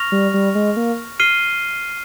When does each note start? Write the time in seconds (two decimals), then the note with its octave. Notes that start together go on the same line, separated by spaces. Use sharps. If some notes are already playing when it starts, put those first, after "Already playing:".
Already playing: C#6 F6 A#6 F7
0.12 G3
0.34 G3
0.55 G#3
0.76 A#3
1.20 F6 C7 D#7 G7